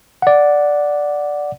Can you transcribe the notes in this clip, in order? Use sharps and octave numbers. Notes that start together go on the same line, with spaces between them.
D5 F#5